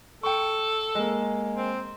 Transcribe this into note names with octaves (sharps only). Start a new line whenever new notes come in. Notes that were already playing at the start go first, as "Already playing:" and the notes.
A4 G5 C#6
G#3 A#3
C4